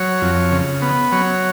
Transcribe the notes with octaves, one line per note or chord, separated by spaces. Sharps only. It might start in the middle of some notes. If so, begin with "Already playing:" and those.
Already playing: F#3 C#5
F2
C#3
B3
F#3 C#5